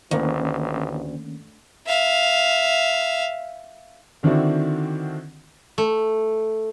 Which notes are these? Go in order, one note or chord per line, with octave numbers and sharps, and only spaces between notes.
A1 D2 D#3 A#3 C#4
E5 F5
D3 D#3 C4 D4 E4 F#4
A3